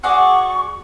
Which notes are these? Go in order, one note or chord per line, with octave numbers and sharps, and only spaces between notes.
F#4 G#4 D5 C#6